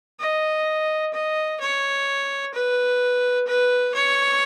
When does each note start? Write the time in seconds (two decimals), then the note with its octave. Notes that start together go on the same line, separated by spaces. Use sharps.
0.20 D#5
1.14 D#5
1.60 C#5
2.54 B4
3.47 B4
3.94 C#5